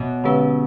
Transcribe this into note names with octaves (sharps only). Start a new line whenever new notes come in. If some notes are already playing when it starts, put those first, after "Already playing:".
Already playing: B2 B3 F#4 C#5
D3 G#3 C#4 G#4 B4